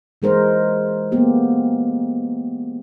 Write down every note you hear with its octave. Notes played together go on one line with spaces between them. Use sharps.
E3 G#3 A#4 C5
A#3 B3 G4